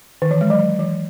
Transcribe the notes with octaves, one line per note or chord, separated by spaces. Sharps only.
D#3
E3
G#3
F#3
E3